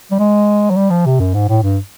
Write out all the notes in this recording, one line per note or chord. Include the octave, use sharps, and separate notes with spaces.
G3
G#3
F#3
G3
F3
C3
F#2
G#2
A2
G2